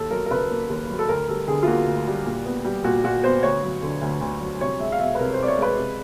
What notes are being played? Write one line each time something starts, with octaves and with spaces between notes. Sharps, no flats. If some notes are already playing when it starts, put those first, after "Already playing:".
Already playing: D#2 A4
F#3 A#4
A#4
C#3 B4
A#3
D#2
F#3
A4
D2 A#4
G3 A4
D3 G#4
F4
A#3 F#4
D2
G3
A#2
B3
G3
A#2 F#4
A#2 F#4
B3 C5
D2 C#5
F#3
D3
D2
D2
F#3
C2 C#5
G#3 E5
F5
B2 E5
B4
C2 A#4
C5
C2 D5
C#5
G#3 B4
C3